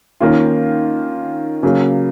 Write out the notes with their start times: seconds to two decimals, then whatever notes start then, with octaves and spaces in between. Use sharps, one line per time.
0.21 D#3 A#3 C#4 F4
1.63 C#3 F#3 A#3